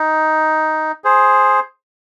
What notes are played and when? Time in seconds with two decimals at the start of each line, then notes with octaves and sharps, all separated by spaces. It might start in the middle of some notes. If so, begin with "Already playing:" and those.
Already playing: D#4
1.04 G#4 C5